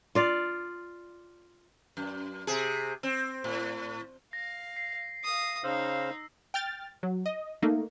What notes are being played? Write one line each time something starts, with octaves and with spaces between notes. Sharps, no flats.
F4 D5 F5
F#2
C3 G#4
C4
A2
F5 A#6
C7
F5 D#6
C#3 D#4 C5 F5 E6
G5 F6 A6
F#3
D#5
A3 A#3 D#4